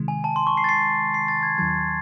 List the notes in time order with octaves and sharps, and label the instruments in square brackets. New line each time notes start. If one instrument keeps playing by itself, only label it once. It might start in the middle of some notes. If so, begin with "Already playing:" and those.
Already playing: [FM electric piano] C3 D#3 G#3
[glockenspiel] G#5
A5
C6
C#6
C7
A6
C7
C7
A6
G#6
[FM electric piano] D#2 D#3 F#3 [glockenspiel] G#6